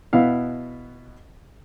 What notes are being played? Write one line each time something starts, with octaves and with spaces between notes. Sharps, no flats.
B2 B3 E4 F5